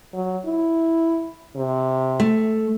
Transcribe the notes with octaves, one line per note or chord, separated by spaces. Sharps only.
F#3
E4
C3
A3